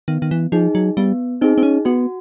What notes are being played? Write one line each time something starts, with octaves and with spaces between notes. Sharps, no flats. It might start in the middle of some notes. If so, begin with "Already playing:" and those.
D#3 B3
D#3
E3
F3 D#4 G#4
F#3
G3 B3
C4 D#4 G#4
C4
C#4
B3 F#4